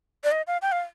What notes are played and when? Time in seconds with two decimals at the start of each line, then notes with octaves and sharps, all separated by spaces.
0.24 D5
0.32 D#5
0.47 F5
0.62 G5
0.72 F5